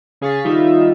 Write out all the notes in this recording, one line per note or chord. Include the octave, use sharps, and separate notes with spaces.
C#3 G#4 F5 C#6 A6 B6
D#3 G3 D#4 F4 E5